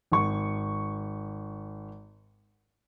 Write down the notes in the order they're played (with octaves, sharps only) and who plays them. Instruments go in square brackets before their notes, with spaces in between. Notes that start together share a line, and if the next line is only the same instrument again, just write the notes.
[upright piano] G#1 C#6